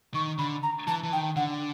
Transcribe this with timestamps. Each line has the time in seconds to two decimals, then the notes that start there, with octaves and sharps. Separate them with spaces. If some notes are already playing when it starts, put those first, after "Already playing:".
0.14 D#3 C#6
0.38 D3 B5
0.63 A#5
0.87 E3 A5
1.03 E3
1.12 D#3 G5
1.36 D3 F#5